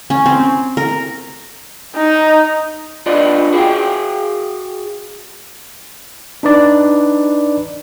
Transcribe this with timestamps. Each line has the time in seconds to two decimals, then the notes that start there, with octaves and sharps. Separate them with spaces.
0.10 C#4
0.26 C4
0.77 A#4
1.95 D#4
3.06 D4 F4 B4 D5 D#5
3.53 F#4 G#4 F5 G5
6.43 D4 D#4 B4 D5